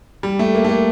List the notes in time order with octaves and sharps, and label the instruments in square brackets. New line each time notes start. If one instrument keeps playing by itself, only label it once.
[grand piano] G3
A3
A#3
A3
A#3